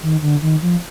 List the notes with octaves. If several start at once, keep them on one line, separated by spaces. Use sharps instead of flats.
D#3
D3
D#3
F3